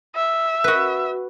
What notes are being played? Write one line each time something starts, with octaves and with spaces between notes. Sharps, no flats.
E5
F#4 B4